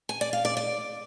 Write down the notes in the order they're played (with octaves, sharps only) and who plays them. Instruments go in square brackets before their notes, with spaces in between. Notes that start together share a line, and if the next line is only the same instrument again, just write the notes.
[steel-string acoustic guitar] G#5
D5
F5
D5
D5